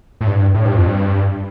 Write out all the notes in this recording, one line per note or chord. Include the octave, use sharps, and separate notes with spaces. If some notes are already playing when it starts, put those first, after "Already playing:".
A2
G2
A2
G2
F2
G2